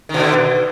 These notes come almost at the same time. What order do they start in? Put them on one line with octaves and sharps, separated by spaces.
D#3 B2 D3